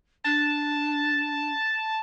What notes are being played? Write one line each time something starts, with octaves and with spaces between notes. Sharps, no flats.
D4 A5